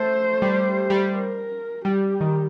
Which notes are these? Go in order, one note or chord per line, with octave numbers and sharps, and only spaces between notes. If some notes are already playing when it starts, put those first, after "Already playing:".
Already playing: A3 C5
G3
G3
A#4
G3 G4
D#3